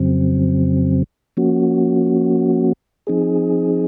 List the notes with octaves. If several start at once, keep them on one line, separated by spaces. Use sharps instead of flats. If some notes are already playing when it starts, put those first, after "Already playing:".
Already playing: F2 C#3 F#3 C4
F3 A#3 C#4 F#4
F3 C4 D#4 G#4